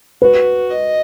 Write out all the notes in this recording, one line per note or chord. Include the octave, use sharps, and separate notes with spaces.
F#4 B4
D#5